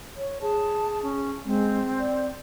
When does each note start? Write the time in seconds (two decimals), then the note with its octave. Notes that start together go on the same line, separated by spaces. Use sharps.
0.17 C#5
0.42 G#4 A5
1.03 C#4
1.45 G#3 C4
1.99 D5